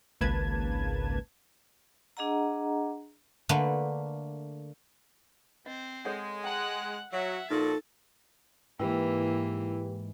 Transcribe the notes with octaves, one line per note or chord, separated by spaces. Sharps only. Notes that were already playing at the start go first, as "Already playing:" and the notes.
G#1 C#2 A#3 B4 A5 G#6
D4 G#4 D#5 F#5 A#5
D3 A3 A#3 B4
C4 C5 D#5
G#3 A4 C#5 F#5
F#5 G5 A#5 F#6
F#3 E5 F#5
A#2 F3 D#4 F#4 A4 A6
G#2 E3 A#3 E4 G4 B4 G5